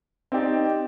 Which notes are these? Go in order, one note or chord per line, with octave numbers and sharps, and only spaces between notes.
C4 D#4 G4 D5